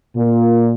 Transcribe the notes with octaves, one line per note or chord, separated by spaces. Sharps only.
A#2